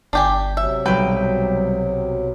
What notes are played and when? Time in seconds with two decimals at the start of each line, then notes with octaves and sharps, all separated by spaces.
0.13 G1 D4 G4 G#5
0.57 C3 F#3 E5
0.86 B1 G3 B4 G5